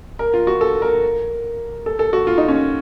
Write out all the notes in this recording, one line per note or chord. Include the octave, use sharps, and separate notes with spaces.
A#4
F4
F#4
A4
A#4
A4
A4
F#4
F4
D#4
C#4